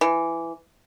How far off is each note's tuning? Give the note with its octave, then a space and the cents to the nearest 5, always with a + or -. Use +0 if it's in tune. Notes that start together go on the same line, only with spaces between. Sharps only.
E3 +15